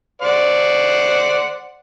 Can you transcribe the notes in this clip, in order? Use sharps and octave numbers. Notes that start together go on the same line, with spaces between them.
C5 D5 F#5